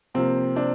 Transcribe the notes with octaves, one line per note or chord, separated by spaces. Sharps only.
C3 F3 A#3 C4
C4 D4